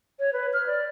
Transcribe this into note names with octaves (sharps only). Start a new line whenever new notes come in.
C#5
B4
F6
D5